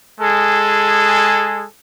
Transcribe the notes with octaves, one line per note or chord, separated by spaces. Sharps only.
G#3 G#4 A4